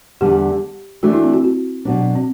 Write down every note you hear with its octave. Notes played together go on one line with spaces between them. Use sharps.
E2 D3 G3 D4 G4
E3 A3 D4 F#4
E4
C4
F#4
F#4
B2 F#3 B3 D4
C4